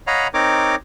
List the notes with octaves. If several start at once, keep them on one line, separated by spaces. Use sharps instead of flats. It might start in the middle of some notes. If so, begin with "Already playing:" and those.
C#5 D#5 F5 F#5 A#5 B5
C4 D#4 A#4 C#5 D6